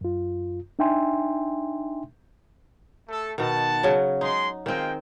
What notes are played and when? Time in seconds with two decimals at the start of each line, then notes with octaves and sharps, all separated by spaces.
0.01 F#2 F4
0.79 D4 D#4 E5 G5 G#5 C6
3.08 A3 A4
3.38 B2 D#3 F#5 A5
3.83 C#3 F#3
4.21 G#3 D#4 C6
4.66 D#3 G#3 C4 F4 G5